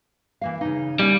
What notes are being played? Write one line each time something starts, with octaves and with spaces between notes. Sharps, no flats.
E3 A#3 F5
C#3 D#4
G3 A#3 C#4